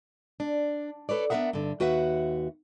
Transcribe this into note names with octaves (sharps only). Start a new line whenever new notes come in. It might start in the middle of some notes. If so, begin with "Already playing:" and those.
D4
A4 B4 C#5 D5
B3 D4 D#4 A#4 E5 F#5
G2 D3
D#2 F#4 B4 E5 F#5